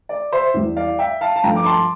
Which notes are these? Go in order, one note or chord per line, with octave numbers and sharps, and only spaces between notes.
D5
C5 E5
E2 E3 G3
D5 F5
E5 G5
F5 A5
A5
G2 F3 A3 G5 A#5
D6
A5 C6